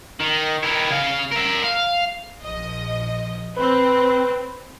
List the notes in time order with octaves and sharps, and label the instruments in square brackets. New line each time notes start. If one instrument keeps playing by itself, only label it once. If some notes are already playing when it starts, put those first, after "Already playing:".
[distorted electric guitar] D#3
D#3 E4
C#3 F5
A#4 E5
F5
[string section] A#1 F3 D#5
[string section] C4 [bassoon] B4